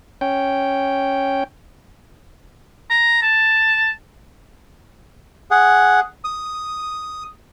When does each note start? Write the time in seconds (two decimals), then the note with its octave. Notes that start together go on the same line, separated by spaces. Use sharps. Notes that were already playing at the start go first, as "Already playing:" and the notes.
0.21 C#4 G5
2.90 A#5
3.22 A5
5.51 G#4 F#5
6.24 D#6